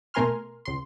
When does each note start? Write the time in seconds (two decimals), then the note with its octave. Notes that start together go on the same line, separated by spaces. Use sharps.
0.14 B2 A3 A#4 G#5 C6 F6
0.65 C#2 C6